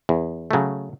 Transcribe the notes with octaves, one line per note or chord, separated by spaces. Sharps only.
E2
C#3 F#3 A3